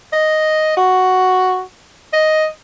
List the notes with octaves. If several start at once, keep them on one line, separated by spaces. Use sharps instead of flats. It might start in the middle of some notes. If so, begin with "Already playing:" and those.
D#5
F#4
D#5